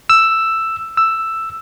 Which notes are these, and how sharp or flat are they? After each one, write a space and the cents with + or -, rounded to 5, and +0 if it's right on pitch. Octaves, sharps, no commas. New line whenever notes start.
E6 +5
E6 +5